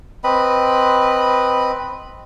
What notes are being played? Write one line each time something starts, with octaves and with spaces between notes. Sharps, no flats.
C4 B4 D#5 B5